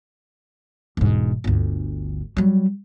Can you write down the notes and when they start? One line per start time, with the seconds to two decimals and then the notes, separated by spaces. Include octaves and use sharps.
0.97 E1 G#2
1.44 G1 D2
2.37 F#3 G3